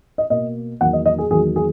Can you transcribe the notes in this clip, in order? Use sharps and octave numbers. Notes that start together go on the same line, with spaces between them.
D#5
B2 A#3 D#5
E2 D#3 F#3 A#3 F#5
D#5
D#5
G#4
E2 D#3 F#3 A#3 G#4
G#4